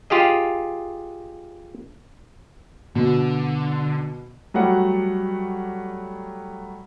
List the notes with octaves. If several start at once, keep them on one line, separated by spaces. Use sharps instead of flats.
F4 G4 G#4 D#5
B2 D3
F#3 G3 A3 F#5